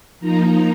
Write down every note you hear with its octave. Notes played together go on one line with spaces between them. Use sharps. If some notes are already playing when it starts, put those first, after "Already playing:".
F3 A#3 D#4 A#5